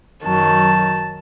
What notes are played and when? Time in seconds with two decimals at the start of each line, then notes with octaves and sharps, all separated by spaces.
0.23 F#2 D#3 F#3 A5